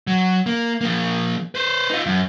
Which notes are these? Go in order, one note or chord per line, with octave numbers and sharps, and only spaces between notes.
F#3
A#3
F3 A#3
B4 C5
D#4 F4
F#2